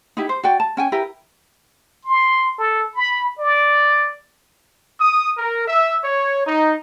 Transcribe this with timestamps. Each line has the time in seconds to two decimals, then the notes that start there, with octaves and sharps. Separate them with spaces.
0.17 D#4 E4 G4
0.29 C5
0.43 F#4 D5 G5
0.60 A5
0.77 C#4 G5 G#5
0.92 E4 G4 A#4 B4
2.05 C6
2.58 A4
2.95 B5
3.39 D5
5.01 D#6
5.38 A#4
5.68 E5
6.04 C#5
6.46 D#4